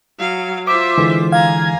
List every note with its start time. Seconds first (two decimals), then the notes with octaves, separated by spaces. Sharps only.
0.19 F#3 F5
0.67 F4 C5 E5 D6
0.98 D3 E3 G#3
1.32 F5 G#5 A#5 G#6